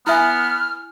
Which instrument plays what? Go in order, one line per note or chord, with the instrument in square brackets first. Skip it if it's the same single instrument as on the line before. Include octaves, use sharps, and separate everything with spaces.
[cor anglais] B3 [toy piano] E4 E5 G#5 [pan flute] F6